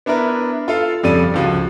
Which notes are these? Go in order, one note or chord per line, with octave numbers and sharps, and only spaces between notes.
B3 D4 E4 A#4 B4
F4 A4 F5
F2 C#3 G3 A4 D5 D#7
C#2 F3 F#4